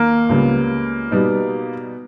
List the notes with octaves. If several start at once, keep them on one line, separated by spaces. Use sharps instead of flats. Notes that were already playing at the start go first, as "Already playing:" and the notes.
Already playing: D#2 D#3 A#3
C#2 C#3 G3 B3
B2 G3 B3 D#4